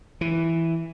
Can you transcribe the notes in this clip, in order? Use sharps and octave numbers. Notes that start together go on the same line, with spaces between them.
E3